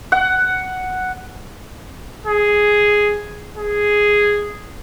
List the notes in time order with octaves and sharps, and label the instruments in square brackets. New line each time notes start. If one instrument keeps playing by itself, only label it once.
[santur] F#5
[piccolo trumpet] G#4
G#4